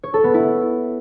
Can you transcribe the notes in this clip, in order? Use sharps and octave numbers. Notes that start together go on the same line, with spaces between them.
C#5
A4
B3
E4